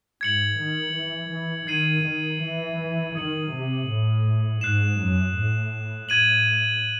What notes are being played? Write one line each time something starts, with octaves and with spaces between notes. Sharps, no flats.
G#2 G#6 C#7 F#7
D#3
E3
E3
D#3 G#6 C7 D#7 F#7
D#3
E3
D#3 D#6 G#6 C#7 F#7
C3
A2
G#2 F#6 C7 E7
F#2
A2
A2 G#6 D#7 F#7